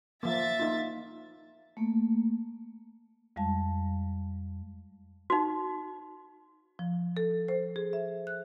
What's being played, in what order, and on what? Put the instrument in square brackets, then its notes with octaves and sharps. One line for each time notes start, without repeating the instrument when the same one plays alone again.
[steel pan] F3 A#3 [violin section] E5 A6
[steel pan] A#3 D#4 F4
[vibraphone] A3 A#3
[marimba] F2 G3 G#3 F5 A5
[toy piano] D#4 F#4
[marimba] F3
A4
C5
G#4
E5
F#6